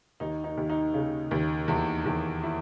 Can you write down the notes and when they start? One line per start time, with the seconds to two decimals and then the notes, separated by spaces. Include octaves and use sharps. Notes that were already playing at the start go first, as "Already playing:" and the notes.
0.20 D#2 D#4
0.44 D#4
0.57 D#2
0.70 D#4
0.94 C#3
1.31 D#2
1.68 E2
2.05 E2
2.43 E4